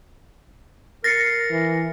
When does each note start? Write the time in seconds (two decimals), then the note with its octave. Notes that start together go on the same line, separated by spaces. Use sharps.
1.04 A#4 A6 A#6 C7 C#7
1.51 E3